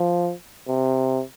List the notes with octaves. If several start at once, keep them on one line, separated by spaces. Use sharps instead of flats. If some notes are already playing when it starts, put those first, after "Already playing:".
Already playing: F3
C3